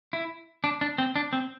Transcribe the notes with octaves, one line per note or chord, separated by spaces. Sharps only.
E4
D4
D4
C4
D4
C4